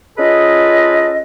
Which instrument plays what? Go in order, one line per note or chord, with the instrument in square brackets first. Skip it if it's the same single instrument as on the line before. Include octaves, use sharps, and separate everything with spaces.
[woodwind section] C#4 F4 G#4 A4 B4 D#5